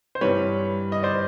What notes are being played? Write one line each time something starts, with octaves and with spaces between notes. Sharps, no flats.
C5
G2 E3 G3 B4 C#5
D#5
C5 D5